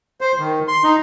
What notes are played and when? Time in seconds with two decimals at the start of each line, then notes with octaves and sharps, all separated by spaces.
0.21 C5
0.39 D#3
0.68 C6
0.84 D#4